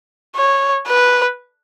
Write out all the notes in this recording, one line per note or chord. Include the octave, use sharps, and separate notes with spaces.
C#5
B4